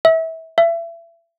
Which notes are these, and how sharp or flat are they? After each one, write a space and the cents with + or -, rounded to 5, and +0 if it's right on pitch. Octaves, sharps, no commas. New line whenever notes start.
E5 -25
E5 +30